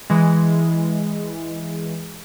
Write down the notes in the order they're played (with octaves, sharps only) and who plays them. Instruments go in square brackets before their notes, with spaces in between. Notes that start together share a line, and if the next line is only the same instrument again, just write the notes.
[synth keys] E3 G#3